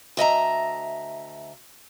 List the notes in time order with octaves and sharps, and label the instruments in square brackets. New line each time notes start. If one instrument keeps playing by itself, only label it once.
[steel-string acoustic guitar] D2 D#5 E5 A#5